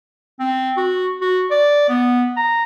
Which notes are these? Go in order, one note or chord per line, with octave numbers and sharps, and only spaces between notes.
C4
F#4
F#4
D5
B3
A#5